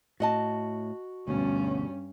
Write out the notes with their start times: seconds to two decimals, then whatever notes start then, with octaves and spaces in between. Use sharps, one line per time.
0.20 A2 F#4 D#5 A5
1.28 D2 G2 B2 C#4